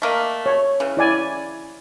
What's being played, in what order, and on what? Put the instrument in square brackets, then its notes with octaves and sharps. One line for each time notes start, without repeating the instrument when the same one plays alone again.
[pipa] A3 A#3 D#5
[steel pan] C#5
[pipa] C#3 E3
[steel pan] E4 D5 G#5